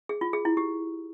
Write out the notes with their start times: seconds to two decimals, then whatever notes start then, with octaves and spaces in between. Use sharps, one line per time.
0.09 G#4
0.21 F4
0.33 G#4
0.45 E4
0.57 G4